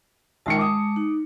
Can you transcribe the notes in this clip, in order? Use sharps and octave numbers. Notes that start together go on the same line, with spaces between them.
A#1 D#3 G#3 A5 C#7
D6 D#6
D#4